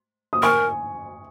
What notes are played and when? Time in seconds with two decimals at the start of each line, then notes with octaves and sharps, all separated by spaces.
0.33 D#6
0.43 A#4 G#5 C#6